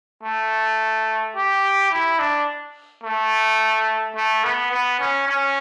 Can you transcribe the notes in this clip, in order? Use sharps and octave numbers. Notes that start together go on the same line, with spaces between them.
A3
G4
E4
D4
A3
A3
B3
B3
C#4
C#4